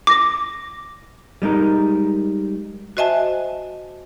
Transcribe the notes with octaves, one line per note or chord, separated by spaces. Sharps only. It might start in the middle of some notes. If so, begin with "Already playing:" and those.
D6 A#6
G3 G#3 D#4 A#4
F#4 C5 D#5 E5 G#5 A5